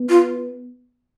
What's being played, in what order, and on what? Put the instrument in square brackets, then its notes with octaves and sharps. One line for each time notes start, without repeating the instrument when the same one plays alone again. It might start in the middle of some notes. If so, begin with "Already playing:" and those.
Already playing: [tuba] B3
[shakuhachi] F4